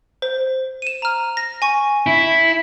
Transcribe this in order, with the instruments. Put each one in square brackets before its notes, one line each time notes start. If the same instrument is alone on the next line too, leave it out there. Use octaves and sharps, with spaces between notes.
[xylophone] C5
D#7 E7
A#5 F6
A#6
G#5 C#6
[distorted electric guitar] E4